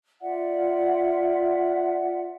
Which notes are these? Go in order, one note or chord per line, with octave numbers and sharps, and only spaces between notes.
F4 D5 E5 F#5